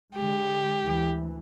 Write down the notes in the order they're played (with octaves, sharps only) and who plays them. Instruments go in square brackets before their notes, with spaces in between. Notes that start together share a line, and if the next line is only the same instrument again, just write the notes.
[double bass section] D3 G#3 [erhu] G4
[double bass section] D2 E3